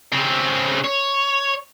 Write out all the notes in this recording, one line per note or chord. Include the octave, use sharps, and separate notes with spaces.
C#3 C4
C#5